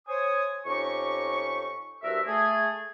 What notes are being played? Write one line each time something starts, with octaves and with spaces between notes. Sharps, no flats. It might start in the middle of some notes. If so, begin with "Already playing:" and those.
C5 C#5 G#5 D#6
F2 C#4 D#4 G4 C#6
C2 G2 F#4 A#4 E5
A3 G#4